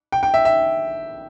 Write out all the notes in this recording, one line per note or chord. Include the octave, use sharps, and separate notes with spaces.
G5
G5
E5
E5